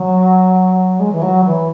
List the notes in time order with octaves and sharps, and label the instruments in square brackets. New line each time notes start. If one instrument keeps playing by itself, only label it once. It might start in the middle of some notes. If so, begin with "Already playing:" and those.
Already playing: [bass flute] F#3
G#3
E3
F#3
E3